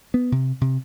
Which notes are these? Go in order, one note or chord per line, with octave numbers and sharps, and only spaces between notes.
B3
C3
C3